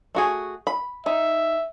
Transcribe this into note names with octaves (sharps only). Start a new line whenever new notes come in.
A3 F#4 G#4
B5
D#4 E5